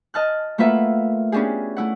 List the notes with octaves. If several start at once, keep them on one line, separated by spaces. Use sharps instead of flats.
D#5 A5 F6 F#6
A3 A#3 F4 B4 E5 F#5
B3 C#4 D4 G4 G#4
A3 E4 F#5